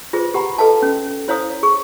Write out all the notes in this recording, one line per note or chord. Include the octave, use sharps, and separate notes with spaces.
F4 G#4 B4 C5
G4 F#5 A#5 B5
A4 B4 D#5 F5 A5
C#4
E4 C5 C#5 F5 A#5 D#6
G#4 C#6